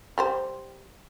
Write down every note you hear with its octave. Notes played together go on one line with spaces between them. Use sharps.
G3 G4 C5